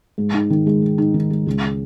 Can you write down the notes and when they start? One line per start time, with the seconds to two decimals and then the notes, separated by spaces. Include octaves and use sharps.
0.18 G#2
0.34 D#4
0.50 D#3
0.67 G#3
0.82 G#2
0.98 D#4
1.14 D#3
1.30 G#3
1.46 C#2